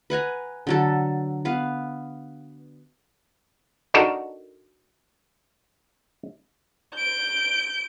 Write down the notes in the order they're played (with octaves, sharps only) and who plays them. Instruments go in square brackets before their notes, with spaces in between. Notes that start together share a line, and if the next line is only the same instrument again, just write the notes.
[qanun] B4 F#5 G#5 A#5
D3 F#3 A4
B3 B4 F5
[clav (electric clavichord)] D4 D#4 F#4 A4 A#4
[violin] G6 D7